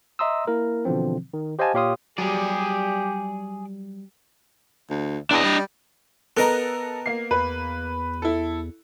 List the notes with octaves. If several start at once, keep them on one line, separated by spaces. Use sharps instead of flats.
D#5 E5 A#5 C6 D#6 E6
A#3 E4 A#4
B2 D3 E3 F3 C4
D#3
G4 C5 D#5 F5 G#5 A5
A#2 G4 C#5 F5 C6 D#6
F#3 G3 G4 G#4 D5
D2
E2 D4 D#5
G3
B3 A4 A#4 D#5 A#5 F#6
A#3 C7
E2 B4
E4 A4